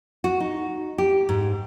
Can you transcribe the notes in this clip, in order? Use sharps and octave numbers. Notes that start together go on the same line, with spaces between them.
F#4
D#4
G4
G#2